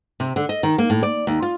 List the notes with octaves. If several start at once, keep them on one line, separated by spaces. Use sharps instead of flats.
C3
D3
D#5
D#3
A#3
A2
D5
D#2
F4